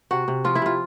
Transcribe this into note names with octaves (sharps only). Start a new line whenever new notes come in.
C3 F#4
C3
F3 F4
E4
C3 F4